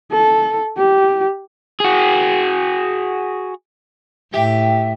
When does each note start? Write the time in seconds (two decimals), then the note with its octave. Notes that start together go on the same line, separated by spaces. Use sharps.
0.12 A4
0.77 G4
1.80 F#4 G#4
4.34 A2 G4 E5